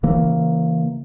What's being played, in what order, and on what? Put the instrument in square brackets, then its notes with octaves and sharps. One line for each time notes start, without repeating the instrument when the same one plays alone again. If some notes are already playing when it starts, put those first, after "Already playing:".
[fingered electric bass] C#3 E3 A#3